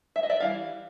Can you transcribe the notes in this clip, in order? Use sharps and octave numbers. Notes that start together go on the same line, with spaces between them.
E5
D#5
D5 E5
E3 G3 F5